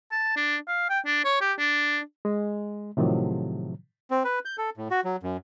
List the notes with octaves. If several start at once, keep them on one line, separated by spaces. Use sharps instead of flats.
A5
D4
F5
G5
D4
C#5
G4
D4
G#3
A2 C3 D#3 F3 F#3
C4
B4
G6
A4
A2
F#4
F#3
F#2